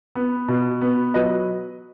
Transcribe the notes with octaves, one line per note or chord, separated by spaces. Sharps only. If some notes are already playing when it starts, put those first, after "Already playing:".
B3
B2
B3
F#3 B4 D#5